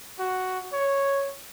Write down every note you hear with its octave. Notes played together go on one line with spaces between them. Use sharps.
F#4
C#5